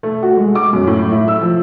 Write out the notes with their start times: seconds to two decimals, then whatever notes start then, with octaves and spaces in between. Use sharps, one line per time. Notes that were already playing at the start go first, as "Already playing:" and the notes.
0.03 A3
0.23 F#4
0.37 G#3
0.55 D6
0.73 F#2
0.87 A2
1.11 E4
1.28 E6
1.41 F3